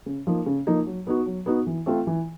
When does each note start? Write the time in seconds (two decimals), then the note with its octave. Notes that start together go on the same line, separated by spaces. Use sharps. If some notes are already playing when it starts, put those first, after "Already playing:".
0.06 C#3
0.27 F3 A#3 D#4
0.46 C#3
0.67 F3 A#3 D#4
0.86 F#3
1.07 B3 D#4 F#4
1.26 F#3
1.46 B3 D#4 F#4
1.66 E3
1.86 A3 C4 F4
2.07 E3